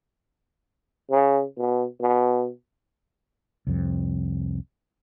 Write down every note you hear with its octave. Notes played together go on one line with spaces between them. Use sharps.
C#3
B2
B2
C2 F2